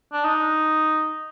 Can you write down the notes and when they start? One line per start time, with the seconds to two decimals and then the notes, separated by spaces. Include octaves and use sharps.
0.13 D4
0.24 D#4